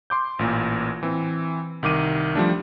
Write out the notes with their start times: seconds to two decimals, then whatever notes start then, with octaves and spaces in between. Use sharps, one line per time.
0.10 C6 D6 G6
0.39 A1 A#2 A#3
1.03 E3 C4
1.83 C2 D#3 D6 D#7
2.35 F3 G3 A3 D4